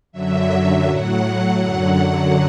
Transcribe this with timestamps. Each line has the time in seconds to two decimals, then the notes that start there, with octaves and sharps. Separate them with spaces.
0.12 F#2 D3 F#3 E5
0.87 A2 F#3 F#5
1.62 F#2 D3 F#3